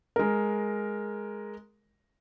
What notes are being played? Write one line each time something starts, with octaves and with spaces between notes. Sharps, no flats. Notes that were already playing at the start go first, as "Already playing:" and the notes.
G#3 A#4